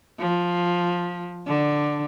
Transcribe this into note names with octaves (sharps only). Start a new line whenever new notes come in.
F3
D3